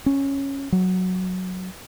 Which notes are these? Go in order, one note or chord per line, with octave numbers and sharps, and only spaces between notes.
C#4
F#3